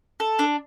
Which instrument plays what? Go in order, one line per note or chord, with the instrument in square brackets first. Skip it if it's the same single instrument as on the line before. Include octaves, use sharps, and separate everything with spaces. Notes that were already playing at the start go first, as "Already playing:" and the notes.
[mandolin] A4
D4